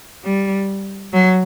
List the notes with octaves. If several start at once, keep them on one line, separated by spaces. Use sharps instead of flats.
G3
F#3